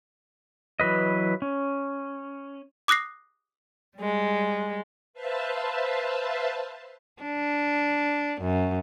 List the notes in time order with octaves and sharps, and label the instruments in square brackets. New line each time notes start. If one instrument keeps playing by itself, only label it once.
[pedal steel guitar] E3 F#3 B4 D#5
C#4
[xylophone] D6 D#6 F#6 A#6 C7
[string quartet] G3 G#3
[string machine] B4 C5 E5 F5 A5
[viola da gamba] D4
F#2